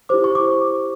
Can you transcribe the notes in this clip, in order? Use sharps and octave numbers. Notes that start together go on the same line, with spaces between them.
E4 G4 C5 D6
C#6
D6